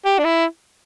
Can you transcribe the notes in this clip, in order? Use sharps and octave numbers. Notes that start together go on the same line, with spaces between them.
G4
D4
E4